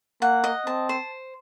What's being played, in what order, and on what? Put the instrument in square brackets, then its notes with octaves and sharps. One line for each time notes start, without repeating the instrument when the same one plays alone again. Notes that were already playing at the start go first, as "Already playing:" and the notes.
[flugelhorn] A#3 [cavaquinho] F#5
[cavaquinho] D#5
[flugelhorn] C4 [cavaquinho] A5
[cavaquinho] C5